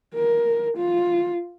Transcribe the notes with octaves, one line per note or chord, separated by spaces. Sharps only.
A#4
F4